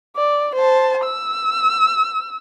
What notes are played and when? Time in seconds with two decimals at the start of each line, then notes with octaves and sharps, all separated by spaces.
0.17 D5
0.55 C5 A5
1.04 E6